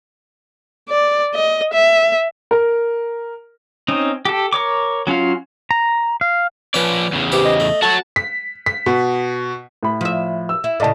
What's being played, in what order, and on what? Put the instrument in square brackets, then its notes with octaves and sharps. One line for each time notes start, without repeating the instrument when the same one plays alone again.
[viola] D5
D#5
E5
[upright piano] A#4
[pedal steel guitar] C4 C#4 D#4
G4 A4
A#4 C#5 D6
F#3 C#4 F4 F5
A#5
F5
[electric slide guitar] F3 D5 [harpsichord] C#4 B4
[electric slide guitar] E2 C#3
[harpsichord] E3 G4 C5
[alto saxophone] D#5
[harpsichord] A3
[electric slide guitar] F#4 C#5 [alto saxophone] A5
[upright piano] B6
B6
B2
A2 B5
[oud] F3 E5
[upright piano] E6
[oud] E4
[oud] A2 C#3 [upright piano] D5 D#5 A5